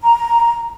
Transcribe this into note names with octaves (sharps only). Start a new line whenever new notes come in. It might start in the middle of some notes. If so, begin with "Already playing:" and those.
A#5